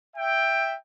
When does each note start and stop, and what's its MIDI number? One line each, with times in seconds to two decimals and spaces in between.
0.16 0.75 76
0.16 0.75 79